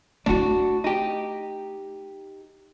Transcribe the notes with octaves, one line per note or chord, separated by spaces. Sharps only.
A3 D4 E4 F#4
D#4 G4